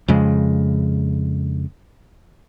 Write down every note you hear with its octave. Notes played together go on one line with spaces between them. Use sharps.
F2 C#3 G#3